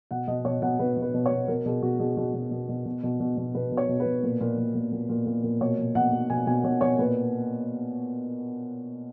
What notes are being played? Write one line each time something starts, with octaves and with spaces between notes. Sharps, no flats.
B2 F#5
B2 D#5
B2 C#5
B2 F#5
B2 B4
B2
B4
B2
C#5
B2
B2 A#4
B2 G#4
B2 F#4
B2 G#4
B2 F#4
B2
B2
B2
B2
B2
B2
B2
B2 B4
B2
C#5
B2
B4
B2
A#2
A#2
A#2
A#2
A#2
A#2
A#2
A#2
B2 C#5
B2
B2 F#5
B2
B2 G#5
B2 G#5
B2 C#5
B2 C#5
A#2 B4